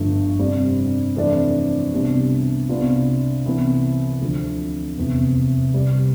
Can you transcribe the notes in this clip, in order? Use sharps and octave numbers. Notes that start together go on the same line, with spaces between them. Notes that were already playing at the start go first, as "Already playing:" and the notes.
Already playing: G1 G2 F3 A3
F2 C3 G3 D4
F2 C3 E3 A3 D4
C2 B2 G3 D4
C2 B2 B3 D4 F4
C2 C3 E3 B3
D2 D3 F3
F1 E2 C3
C2 C3 G3